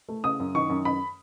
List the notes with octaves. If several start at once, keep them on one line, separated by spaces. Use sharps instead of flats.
A3
C#3 D#6
F#2
D#3 C#6
F#2
F#2 B5